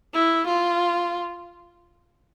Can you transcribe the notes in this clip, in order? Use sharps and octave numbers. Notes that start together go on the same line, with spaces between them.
E4
F4